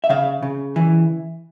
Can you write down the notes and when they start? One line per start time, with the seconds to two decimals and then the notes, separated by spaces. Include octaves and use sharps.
0.04 E5
0.09 C#3 F5
0.42 C#3
0.76 E3